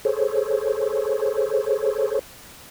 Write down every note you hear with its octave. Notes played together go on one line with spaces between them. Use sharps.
G#4 A4 C5 C#5